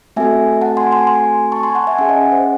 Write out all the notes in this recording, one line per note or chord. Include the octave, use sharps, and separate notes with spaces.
A3 C4 F#4 A4 E5 G#5
F#5 A5
G#5 C6
G#5 C6
G#5 C6
A5 C#6
G#5 C6
F#5 A5
E5 G#5
C#4 G#4 E5 G#5
D#5 F#5
C5